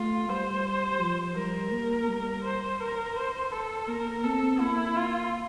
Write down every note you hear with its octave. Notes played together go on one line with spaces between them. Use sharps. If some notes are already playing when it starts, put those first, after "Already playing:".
Already playing: A3 F4
G3 C5
F3
G3 A#4
A#3
G3
C5
A#4
C5
A4
A#3 A#4
C4 A4
A#3 E4
F4